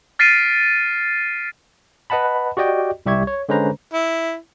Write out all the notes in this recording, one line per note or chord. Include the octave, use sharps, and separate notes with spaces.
F6 A6 B6 C7 D7 D#7
B4 D#5 F#5 A5 B5
F#4 G4 D5 D#5 G5
C2 G3 G4 E5 C#6 G#6
C#5
D3 G#3 C#4 B4 C5 A#5
E4